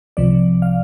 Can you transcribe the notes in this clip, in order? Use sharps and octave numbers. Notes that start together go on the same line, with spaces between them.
C2 C3 F3 D5
F5